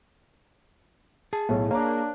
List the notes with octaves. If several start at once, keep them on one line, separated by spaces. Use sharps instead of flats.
G#4 A5
B1 A2 C#5
A#3 D4 C#5 A#5 D6